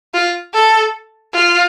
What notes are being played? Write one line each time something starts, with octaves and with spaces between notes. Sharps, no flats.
F4
A4
F4